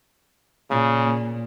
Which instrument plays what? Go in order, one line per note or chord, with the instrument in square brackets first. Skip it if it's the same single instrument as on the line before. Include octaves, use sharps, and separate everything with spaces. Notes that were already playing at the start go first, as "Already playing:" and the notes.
[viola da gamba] A#2 A#3 [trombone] C#3